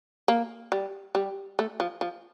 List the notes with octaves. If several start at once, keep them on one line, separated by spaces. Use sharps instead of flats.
A#3
G3
G3
A3
F3
F3